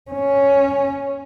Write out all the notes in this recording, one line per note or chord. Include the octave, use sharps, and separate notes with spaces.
C#4